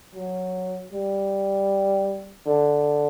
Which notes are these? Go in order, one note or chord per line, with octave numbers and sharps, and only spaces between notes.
F#3
G3
D3